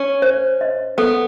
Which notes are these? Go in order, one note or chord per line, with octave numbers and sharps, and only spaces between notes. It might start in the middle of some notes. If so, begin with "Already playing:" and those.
Already playing: C#4
C5
D#5
B3 A4